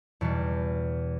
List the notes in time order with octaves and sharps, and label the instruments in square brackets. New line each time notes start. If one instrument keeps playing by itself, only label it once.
[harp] E2 B2 G3